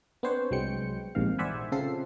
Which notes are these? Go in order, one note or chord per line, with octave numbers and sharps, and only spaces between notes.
B3 C4 D4 C5 C#5 F#5
C2 F#3 G#3 G5 C#7
A#1 E2 G#2 C3 D#3 F5
C5 D5 E5 F#5 G#5 B5
C#3 C4 F4 A4 C7